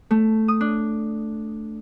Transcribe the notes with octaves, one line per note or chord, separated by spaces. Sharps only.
A3
D#6
D4